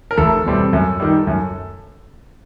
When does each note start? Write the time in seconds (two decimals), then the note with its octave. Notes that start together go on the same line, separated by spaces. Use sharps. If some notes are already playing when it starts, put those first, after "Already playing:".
0.11 A#4
0.17 F1 A4
0.45 E2 B2 G3 C4
0.73 F#2
1.00 D#3 G3
1.27 F#2